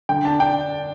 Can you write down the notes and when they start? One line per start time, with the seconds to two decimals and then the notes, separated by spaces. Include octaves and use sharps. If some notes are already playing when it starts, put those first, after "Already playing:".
0.09 D3 G5
0.25 D4 A5
0.40 D4 G5